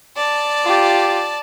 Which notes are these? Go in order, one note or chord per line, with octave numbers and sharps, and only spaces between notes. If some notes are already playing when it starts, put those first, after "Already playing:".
D5 A5
F4 G4